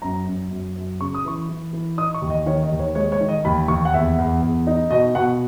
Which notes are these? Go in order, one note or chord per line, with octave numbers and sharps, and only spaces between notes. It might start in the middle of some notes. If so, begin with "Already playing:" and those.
F#2 A#5
F#2
F#2
F#2
C#3 C#6
D#6
E3 C#6
E3
E3
D#4 D#6
C#6
D#2
D#5
D#3 C#5
D#5
D#2
C#5
G#3 C#5
C#5
D#3
D#5
D#2 B5
D#2 C#6
F#5
E2 E5
E2
E2
D#4
B2 D#5
B2 F#5